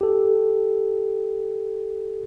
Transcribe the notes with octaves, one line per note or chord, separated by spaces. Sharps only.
G4 A4